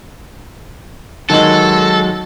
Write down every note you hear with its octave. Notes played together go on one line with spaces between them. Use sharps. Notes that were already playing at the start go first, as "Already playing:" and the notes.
D#3 F#3 G#3 D#4 A4 F#7